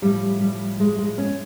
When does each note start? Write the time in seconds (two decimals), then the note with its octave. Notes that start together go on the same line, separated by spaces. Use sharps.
0.02 A2 F3 G3
0.41 G3
0.80 G#3
0.99 G#3
1.18 C#4